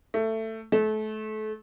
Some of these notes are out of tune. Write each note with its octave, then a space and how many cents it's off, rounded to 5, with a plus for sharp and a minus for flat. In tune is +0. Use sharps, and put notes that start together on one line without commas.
A3 +15
A3 -30